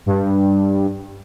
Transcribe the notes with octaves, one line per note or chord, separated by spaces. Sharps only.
G2